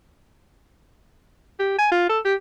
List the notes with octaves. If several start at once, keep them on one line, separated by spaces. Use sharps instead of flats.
G4
G#5
F4
A4
G4